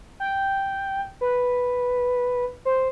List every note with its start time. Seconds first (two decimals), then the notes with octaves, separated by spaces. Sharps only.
0.20 G5
1.21 B4
2.65 C5